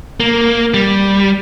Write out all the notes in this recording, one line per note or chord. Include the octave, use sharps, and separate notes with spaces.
A#3
G3